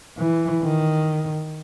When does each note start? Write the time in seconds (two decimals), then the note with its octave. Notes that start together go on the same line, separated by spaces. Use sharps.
0.18 E3
0.63 D#3